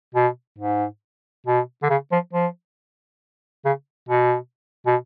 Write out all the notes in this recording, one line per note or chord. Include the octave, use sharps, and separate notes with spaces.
B2
G#2
B2
D3
C#3
F3
F3
C#3
B2
B2